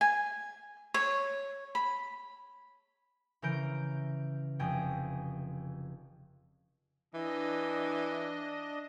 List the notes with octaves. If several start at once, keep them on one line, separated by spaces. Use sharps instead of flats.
G#5
C#5
B5
C#3 E3 A#4 G6 D7
F1 G#4 G5
E3 D4 D#5